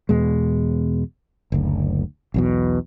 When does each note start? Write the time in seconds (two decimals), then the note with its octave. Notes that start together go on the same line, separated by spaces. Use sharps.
0.09 E2 B2 G#3
1.52 F#1 D2
2.34 B1 E2 B2